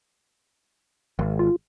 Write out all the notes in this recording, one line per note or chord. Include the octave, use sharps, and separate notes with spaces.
G#1
F4